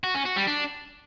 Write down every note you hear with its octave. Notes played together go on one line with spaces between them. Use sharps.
F#4
C#4
F#4
G3
D4